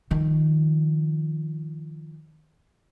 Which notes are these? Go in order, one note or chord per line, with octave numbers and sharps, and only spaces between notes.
D#3 F3